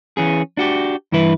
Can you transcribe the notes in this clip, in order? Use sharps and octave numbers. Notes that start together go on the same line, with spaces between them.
E3 C#4 G#4
D4 F#4 G4
G2 E3 E4 B4